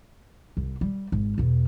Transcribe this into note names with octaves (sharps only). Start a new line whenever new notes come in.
C2
G3
G#1
E2 B2